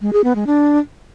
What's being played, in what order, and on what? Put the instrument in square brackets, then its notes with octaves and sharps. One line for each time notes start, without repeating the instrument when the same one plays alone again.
[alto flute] G#3
G#4
B3
G#3
D4